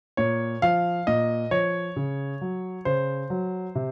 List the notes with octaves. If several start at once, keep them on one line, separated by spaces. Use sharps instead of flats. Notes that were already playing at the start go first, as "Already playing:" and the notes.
A#2 C#5
F3 F5
A#2 D#5
F3 C#5
C#3
F#3
C#3 C5
F#3
C3